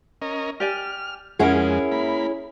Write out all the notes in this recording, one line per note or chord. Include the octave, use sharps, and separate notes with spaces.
C#4 A#4 D#5
G4 D5 G#5 F6
F2 G#3 C#4 E4 G#4 A#4 F#5
A#3 B5